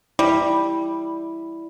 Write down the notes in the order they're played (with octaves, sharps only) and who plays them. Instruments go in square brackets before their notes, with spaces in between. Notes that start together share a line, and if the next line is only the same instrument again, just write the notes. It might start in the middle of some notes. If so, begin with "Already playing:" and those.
[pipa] G3 [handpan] E4